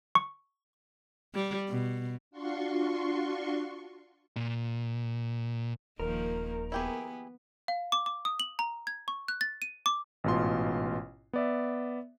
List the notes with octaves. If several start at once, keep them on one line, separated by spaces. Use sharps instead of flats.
C#6
G3
B2
D4 F4 F#4 C6 C#6
A#2
D#1 D#3 F3 A#3 A#4
B3 E4 G4 G#4
F5
D6
D6
D#6
F#7
A#5
G#6
C#6
F#6
A6
D#7
D6
A1 G#2 B2 F4 C6
B3 D5 E5